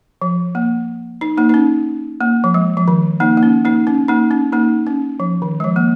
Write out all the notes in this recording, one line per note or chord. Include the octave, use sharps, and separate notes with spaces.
F3
A#3
D#4
A#3 D#4
D#4
C#4
A#3
F3
G#3
F3
D#3
A#3 D#4
A#3
C#4
A#3 D#4
C#4
A#3 D#4
C#4
A#3 D#4
C#4
F3
D#3
G#3
F3
A#3